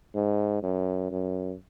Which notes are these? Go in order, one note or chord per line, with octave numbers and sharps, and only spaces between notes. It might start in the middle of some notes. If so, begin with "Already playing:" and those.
G#2
F#2
F#2